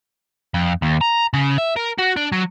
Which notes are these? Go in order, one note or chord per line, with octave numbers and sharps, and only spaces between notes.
F2
D#2
A#5
C#3
E5
A#4
F#4
D4
F#3